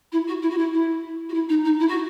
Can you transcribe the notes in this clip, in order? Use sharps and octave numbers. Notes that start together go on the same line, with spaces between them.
E4
F#4
E4
F#4
E4
E4
F#4
E4
D#4
D#4
E4
F#4